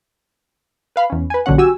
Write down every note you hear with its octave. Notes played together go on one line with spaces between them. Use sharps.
B4 F5 B5
E2 C#4
B4 G#5
A#1 D3 F#3 C#4 F#5
F#4 G4 G#5 E6